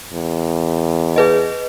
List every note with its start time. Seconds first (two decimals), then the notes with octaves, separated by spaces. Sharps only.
0.13 E2
1.16 G#4 B4 D#5